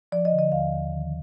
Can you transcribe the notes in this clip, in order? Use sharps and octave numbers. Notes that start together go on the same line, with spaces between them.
F3 D5
D#5
D3
D#5
D#2 F5
D#2
D#3